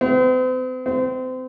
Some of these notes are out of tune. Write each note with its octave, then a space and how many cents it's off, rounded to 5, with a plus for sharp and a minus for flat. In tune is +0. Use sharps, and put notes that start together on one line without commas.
C4 -40
C4 -30